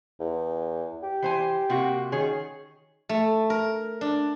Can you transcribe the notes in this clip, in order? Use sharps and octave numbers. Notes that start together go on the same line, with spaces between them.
E2
G4
E3 C5 G#5
C3 A#3 F#4
D#3 C#4 G#4
A3
A#4
D4